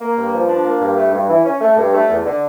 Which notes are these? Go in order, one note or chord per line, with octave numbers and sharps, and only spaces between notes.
A#3
G2
F3
D4
A#3
G2
A3
G2
E3
C#4
A3
G2
A3
E2
D3